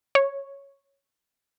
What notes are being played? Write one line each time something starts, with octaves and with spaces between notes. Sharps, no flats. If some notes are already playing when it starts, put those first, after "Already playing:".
C#5